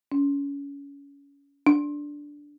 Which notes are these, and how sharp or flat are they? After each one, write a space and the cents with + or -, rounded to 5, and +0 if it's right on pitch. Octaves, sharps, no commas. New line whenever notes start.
C#4 +25
D4 -5